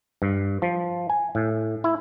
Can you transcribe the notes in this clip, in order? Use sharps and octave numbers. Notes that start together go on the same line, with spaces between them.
G2
F3
G#5
A2
E4